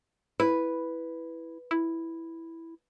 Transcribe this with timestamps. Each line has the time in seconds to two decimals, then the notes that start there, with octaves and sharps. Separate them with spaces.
0.40 E4 B4
1.71 E4